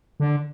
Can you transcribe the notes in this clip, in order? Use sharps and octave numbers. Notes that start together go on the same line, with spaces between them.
D3